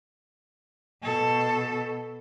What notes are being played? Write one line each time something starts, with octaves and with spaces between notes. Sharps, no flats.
B2 A4